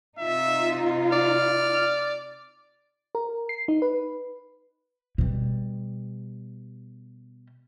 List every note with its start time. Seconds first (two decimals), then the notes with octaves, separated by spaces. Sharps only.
0.19 C3 D#4 F4 E5
1.12 D5 F6
3.15 A#4
3.49 C7
3.68 D#4
3.82 B4
5.18 B2 G3